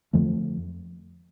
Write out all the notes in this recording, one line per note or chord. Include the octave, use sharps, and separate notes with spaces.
F2 D3 F3 A3